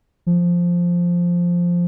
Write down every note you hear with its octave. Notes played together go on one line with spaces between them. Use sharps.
F3